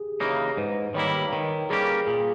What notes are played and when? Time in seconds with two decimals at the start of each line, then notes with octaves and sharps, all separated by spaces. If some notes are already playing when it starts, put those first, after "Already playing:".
Already playing: G4 G#4
0.20 C#3 E3 A#3 D#4 C#5
0.57 G#2 B4
0.94 D#3 G3 A#3 E4 C#5
1.32 D#3 A#4
1.70 G3 A#3 C#4 G4 G#4
2.07 A#2 G#4